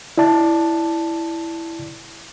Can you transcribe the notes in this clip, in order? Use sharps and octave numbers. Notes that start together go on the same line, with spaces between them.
E4 D5 A5